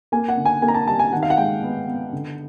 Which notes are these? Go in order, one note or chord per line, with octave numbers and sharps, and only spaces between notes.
A#3 G#5
F#5
D3
G#5
A#3 G#5
A#5
A5
G3 A5
G#5
D#3 F#5
F5
F#5
G#3 G5
B3
B3
D3